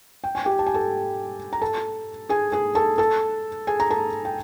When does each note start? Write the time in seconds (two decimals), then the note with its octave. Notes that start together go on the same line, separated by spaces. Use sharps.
0.24 G5
0.35 G#5
0.45 G4 G5
0.59 A5
0.67 G#5
0.74 A4 A5
1.53 A#5
1.61 A4 A5
2.29 G#4 G#5
2.52 G#4 G#5
2.75 A4 A5
2.98 A4 A5
3.67 G#4 G#5
3.80 A#5
3.91 A4 A5
4.25 G5